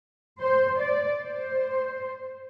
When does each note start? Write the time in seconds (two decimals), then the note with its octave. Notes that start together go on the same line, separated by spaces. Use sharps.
0.41 C5
0.80 D5
1.21 C5